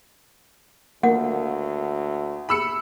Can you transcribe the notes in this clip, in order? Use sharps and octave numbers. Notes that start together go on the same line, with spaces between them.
D2 A#3 F#5
B5 E6 C#7